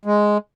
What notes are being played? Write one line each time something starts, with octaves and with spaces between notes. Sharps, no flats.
G#3